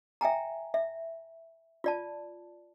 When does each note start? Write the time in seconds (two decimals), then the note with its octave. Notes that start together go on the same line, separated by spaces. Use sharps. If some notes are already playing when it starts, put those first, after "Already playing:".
0.21 E5 G5 G#5 A#5
0.74 E5
1.84 F4 D5 A5